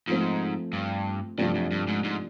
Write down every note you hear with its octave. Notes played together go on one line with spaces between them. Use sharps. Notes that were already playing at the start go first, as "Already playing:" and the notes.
G#2 F3 A3 C4
G2
G2 C3 F3 A3 D4
F#2
G2
G#2
G#2